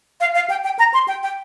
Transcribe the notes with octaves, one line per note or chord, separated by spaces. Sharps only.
F5
F5
G5
G5
A#5
C6
G5
G5